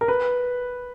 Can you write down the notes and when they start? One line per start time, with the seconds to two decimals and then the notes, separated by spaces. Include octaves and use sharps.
0.01 A#4
0.08 B4